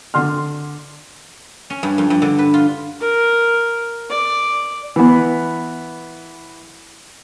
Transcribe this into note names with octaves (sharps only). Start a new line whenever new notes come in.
D3 C6 F6
C#4
G2
F2
G2
D3
B4
F4
A#4
D5
E3 B3